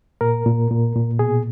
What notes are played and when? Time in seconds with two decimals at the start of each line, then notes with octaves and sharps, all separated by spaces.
0.21 A#2 A#4
0.46 A#2
0.71 A#2
0.96 A#2
1.19 B2 G#4